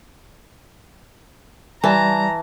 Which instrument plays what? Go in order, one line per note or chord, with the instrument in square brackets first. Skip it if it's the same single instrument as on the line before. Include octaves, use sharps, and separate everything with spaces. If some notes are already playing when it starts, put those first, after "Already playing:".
[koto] E3 [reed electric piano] G3 D5 [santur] A5 [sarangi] A#5